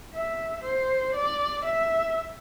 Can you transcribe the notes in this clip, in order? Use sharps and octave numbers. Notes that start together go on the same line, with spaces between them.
E5
C5
D5
E5